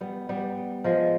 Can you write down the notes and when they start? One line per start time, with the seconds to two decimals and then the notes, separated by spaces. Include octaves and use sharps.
0.01 G3 B3
0.29 G3 B3
0.84 F3 G#3